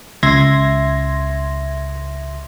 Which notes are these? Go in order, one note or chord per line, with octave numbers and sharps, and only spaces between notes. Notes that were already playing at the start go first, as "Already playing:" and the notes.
C#2 E5 C6 G#6 A#6